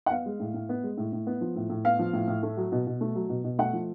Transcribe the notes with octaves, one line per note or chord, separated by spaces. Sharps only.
F#5
B3 F5
G#3
A2
A2
B3
G#3
A2
A2
B3
F3
A2
A2
B3 F5
F3
A2
A2
A3
F#3
B2
B2
A3
F#3
B2
B2
A3 F#5
F3